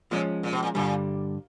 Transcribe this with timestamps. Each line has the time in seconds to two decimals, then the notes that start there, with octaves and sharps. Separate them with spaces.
0.11 A#2 F3 G#3 C#4
0.43 A#2
0.53 B2
0.63 A#2
0.75 G2 A#2 D3 G3